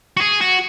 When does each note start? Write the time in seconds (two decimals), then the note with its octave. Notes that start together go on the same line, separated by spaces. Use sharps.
0.17 F#4
0.21 G#4
0.42 F#4